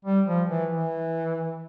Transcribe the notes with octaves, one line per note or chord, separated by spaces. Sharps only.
G3
F3
E3
E3